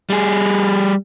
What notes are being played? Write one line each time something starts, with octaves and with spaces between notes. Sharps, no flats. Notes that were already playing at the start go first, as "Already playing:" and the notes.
G3 G#4